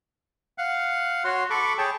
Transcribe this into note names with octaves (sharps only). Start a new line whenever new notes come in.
F5 F#5
F#4 C#5 C6
A4 B5 C#6 D6
G#4 C#5 G5 A5